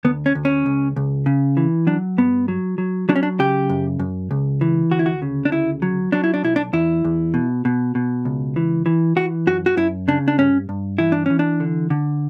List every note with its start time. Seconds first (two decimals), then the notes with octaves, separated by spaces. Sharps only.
0.05 D2 B3
0.26 C#4
0.35 D2
0.45 C#4
0.66 C#2
0.96 C#2
1.26 C#3
1.57 E3
1.87 F#3 D4
2.18 G2 B3
2.48 F#3
2.78 F#3
3.09 F#3 D4
3.16 C#4
3.23 D4
3.40 C#3 G4
3.70 F#2
3.99 F#2
4.31 C#2
4.61 E3
4.91 D2 F#4
4.99 E4
5.06 F#4
5.22 C#3
5.45 D4
5.52 D2 E4
5.82 F#3
6.12 F#3 D4
6.24 E4
6.34 D4
6.44 B1 E4
6.56 D4
6.73 E2 E4
7.05 E2
7.34 B2
7.65 B2
7.95 B2
8.25 C#2
8.56 E3
8.86 E3
9.16 E3 F#4
9.47 F#2 F#4
9.66 F#4
9.77 F#2 E4
10.08 C#3 D4
10.28 D4
10.38 G2 C#4
10.69 G2
10.98 E3 E4
11.12 D4
11.26 E3 C#4
11.39 D4
11.60 D3
11.90 D3